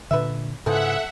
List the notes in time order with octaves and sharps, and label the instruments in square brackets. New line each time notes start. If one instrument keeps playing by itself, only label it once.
[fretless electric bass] A#2 D3 [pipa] B4 E5
[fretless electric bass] G#2 C#3 [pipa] E3 F3 G#4 [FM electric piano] A4 [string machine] E5 F#5